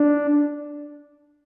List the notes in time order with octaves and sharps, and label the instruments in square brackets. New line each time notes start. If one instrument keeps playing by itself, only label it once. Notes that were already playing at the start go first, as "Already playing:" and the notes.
Already playing: [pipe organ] D4